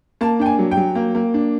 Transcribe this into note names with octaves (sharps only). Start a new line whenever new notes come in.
A#3 A5
D4 G5
G#5
F#3
G5
F#3
A#3
A#3
D4